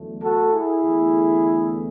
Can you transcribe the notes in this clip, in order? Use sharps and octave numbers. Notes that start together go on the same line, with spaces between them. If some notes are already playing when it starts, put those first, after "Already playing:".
Already playing: E2 D3 F#3 A3
F#4 A4
E4 G#4
E2 D3 A3